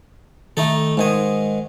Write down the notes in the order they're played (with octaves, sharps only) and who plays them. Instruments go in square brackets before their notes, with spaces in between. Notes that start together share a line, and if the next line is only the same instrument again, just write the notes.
[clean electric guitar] D#3 [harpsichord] A3 D#4 A4
[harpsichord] G#2 D#3 G#5 [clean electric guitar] G#3 D#5